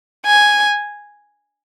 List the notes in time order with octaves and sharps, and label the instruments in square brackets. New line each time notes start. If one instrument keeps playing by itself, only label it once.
[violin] G#5